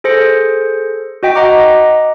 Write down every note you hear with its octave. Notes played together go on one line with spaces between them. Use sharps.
G#4 A4 C5 A#6 C#7
F#4 D#5 G5 B6
D#5 F#5 A#5 D6